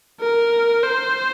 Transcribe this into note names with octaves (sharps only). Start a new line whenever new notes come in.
A#4
C5